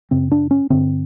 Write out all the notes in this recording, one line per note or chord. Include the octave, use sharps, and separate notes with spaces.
F#2 C#3 C4
D4
C#4
G2 D3 C4